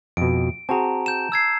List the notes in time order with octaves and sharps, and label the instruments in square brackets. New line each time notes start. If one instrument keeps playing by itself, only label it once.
[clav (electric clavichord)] F2 B2 [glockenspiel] D7
[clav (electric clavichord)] C4 F#4 G#4 [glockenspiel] A5 A#5
[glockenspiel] G6 E7
E6 G#6 C7